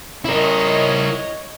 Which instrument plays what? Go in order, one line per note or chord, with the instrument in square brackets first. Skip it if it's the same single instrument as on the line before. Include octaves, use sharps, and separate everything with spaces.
[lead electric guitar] E4 A#4 [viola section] C#5 D#5